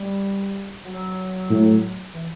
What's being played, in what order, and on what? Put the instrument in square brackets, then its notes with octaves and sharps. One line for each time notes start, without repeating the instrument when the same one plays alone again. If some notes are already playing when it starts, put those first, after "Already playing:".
Already playing: [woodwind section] G3
F#3
[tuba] A2
[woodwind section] E3